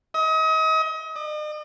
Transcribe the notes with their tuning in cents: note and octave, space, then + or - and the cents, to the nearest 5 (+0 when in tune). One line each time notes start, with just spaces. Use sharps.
D#5 +35
D#5 -45